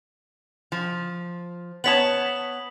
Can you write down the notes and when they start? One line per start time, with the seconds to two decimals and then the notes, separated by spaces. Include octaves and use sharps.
0.72 F3
1.84 B3 C#5 A5 D#6 B6 F#7